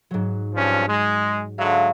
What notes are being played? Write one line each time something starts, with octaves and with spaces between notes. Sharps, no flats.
G#2 F#3
G2 F3 C#4
G#3
D3 F#3 G#3 E5 F5